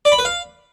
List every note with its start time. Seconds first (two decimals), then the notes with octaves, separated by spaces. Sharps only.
0.05 D5
0.12 B5
0.18 B4
0.25 F5